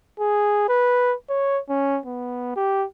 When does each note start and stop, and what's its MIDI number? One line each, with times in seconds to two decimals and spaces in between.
0.20 0.67 68
0.69 1.15 71
1.29 1.60 73
1.69 2.00 61
2.06 2.52 59
2.56 2.85 67